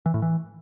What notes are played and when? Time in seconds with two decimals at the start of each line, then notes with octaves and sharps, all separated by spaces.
0.06 E3
0.14 A2
0.22 E3